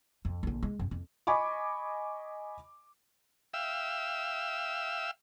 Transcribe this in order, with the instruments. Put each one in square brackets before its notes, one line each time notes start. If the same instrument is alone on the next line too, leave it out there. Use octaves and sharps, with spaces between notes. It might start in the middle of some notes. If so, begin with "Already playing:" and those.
[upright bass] F2
A#1 D3
G#3
F#2
F2
[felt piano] D#5 G#5 B5 C#6 D6
[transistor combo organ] E5 F5 G5 E6